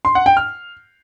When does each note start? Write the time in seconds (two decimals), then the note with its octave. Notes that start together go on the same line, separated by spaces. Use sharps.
0.05 C6
0.15 F#5
0.26 G5
0.37 F6